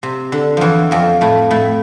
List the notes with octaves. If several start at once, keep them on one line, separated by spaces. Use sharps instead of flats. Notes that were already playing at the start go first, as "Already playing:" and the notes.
C3
D3
E2 E3 F3
F2 F3
A2 A3
A2 A3